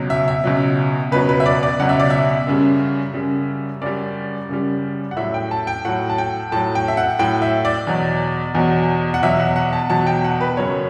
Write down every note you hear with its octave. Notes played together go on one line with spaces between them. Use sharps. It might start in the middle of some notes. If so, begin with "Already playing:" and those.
Already playing: C#2 B2 F#3
E5
E5
C#2 B2 F#3
C#2 B2 F#3 B4
B4
E5
D5
D5
C#2 B2 F#3 F#5
E5
D5
E5
F#2 C#3 G3
F#2 C#3 G3
F#2 C#3 G3 D5
F#2 C#3 G3
F#5
A2 F#3 E5
G5
A5
G5
A2 F#3 F#5
A5
G5
A2 F#3 A5
G5
E5
F#5
A2 F#3 G5
E5
D5
E2 B2 F#3
E2 B2 F#3
F#5
E2 B2 F#3 E5
F#5
F#5
A5
E2 B2 F#3 A5
G5
F#5
B4
F#2 C#3 F#3 C#5